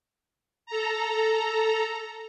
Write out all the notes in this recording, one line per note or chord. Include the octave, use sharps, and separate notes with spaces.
A4 A#5